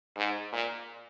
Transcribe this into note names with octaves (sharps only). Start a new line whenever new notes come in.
G#2
A#2